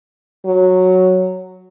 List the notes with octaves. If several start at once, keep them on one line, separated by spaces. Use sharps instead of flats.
F#3